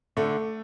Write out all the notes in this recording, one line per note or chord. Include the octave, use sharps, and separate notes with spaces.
D3 A3